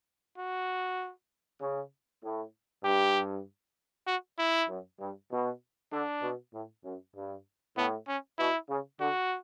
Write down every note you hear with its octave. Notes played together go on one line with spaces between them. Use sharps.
F#4
C#3
A2
G2 G4
F#4
E4
F#2
G2
B2
D3 D4
B2
A2
F#2
G2
A2 B3
C#4
B2 E4
C#3
D3 F#4